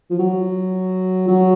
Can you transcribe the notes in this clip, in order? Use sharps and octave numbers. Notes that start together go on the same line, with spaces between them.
F3
F#3
F#3